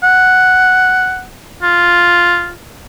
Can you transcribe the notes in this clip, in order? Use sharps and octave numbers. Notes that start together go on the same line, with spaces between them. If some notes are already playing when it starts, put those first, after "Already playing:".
F#5
F4